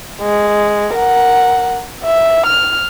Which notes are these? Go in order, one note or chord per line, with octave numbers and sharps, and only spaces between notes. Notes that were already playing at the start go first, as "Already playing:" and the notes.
G#3
A#4 F#5
E5
F6